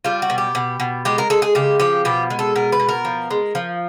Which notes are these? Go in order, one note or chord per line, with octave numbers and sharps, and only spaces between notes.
G3 F4
F#4
B2
G4
B2
B2
G#3 G4
A#4
G#3 A4
G#4
C#3 G4
F3 G4
B2 G4
G#3
A4
B2 A#4
B4
B2
A#4
F3
G#3
F3